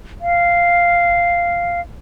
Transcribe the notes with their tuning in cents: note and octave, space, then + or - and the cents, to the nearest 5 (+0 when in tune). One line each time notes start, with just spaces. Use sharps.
F5 -5